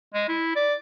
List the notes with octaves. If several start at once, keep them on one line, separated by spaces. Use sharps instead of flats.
G#3
E4
D5